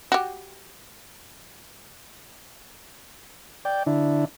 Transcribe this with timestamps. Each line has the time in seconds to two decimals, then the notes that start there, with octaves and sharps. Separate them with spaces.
0.12 F#4 G4
3.65 D5 G5
3.87 D3 D4 E4